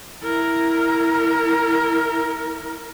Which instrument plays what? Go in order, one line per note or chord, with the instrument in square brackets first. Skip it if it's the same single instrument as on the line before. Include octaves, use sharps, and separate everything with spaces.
[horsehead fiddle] E4 A#4